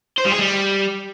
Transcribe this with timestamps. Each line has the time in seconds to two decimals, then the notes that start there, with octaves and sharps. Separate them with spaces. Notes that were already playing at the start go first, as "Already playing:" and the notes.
0.18 C5
0.25 G3
0.32 G#4
0.40 G3